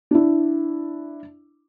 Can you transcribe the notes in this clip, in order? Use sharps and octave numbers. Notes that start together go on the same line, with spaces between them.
D4 E4